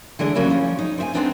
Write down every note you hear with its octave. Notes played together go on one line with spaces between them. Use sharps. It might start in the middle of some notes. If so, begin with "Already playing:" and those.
D3 E3 G#3 D4
C#3 F#3 G3 A#3 E4
F3 C#4
D#4
C4 E5 G#5
G#3 A3 B3 C4 D4 D#4